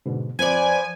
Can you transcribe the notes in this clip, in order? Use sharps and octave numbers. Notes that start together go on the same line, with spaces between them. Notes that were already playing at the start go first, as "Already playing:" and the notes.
G#2 B2 D3
F2 F3 B4 D5 G#5